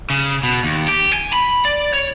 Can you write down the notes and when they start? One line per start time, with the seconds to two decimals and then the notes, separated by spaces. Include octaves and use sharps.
0.10 C#3
0.43 B2
0.63 D#2
0.88 G4
1.13 G#5
1.33 B5
1.65 D5
1.93 C#5